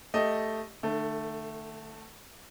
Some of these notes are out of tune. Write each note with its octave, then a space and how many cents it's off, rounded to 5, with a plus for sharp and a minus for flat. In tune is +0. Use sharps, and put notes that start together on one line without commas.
A3 +0 G4 +0 D#5 +0
D3 +40 A3 +5